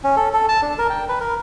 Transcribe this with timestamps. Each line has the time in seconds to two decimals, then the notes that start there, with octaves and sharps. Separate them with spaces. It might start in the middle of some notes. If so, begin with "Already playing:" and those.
0.04 C#4
0.17 A4
0.33 A4
0.49 A5
0.62 D4
0.78 A#4
0.90 G5
1.09 B4
1.20 A#4